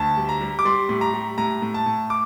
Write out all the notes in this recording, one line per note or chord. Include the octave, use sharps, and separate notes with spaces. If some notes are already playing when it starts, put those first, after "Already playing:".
Already playing: D2 A5
G3
A#5
G3
D6
G3 C6
A2
A#5
G3
A2 A#5
A2
A5
A2
D6